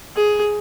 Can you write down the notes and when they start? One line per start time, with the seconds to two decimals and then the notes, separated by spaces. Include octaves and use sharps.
0.16 G#4